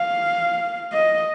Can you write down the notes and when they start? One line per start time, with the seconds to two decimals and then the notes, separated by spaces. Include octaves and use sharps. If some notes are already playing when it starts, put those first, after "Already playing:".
Already playing: F5
0.92 D#5